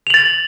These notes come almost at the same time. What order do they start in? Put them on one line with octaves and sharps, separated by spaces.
F7 F#7 A6